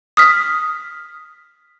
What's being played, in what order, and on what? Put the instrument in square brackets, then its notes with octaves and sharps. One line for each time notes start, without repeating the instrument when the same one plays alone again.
[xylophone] D#6 F6 B6